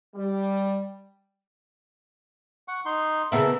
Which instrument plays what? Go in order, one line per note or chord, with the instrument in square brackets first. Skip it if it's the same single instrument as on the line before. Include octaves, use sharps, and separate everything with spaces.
[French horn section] G3
[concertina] F#5 C#6
D#4 C6
[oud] C#3 B3 E4 [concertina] A4 A#4